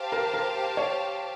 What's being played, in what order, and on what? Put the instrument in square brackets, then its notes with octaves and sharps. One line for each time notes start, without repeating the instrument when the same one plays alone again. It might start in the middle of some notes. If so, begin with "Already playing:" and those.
Already playing: [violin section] G4 C5 F5 A5
[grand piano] A#4
A#4
C#5